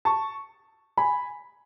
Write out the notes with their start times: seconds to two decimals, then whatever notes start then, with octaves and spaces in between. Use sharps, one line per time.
0.05 A5 C#6
0.97 G#5 B5